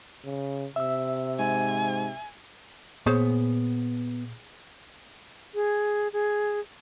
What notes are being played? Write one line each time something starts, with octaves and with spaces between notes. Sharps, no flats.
C#3
C3 E5 E6
G#2 G#5
A#2 B3 G#4 C5 C#5
G#4
G#4